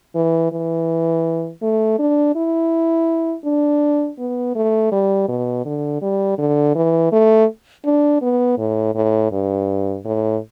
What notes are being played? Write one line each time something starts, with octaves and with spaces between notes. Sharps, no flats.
E3
E3
A3
D4
E4
D4
B3
A3
G3
B2
D3
G3
D3
E3
A3
D4
B3
A2
A2
G2
A2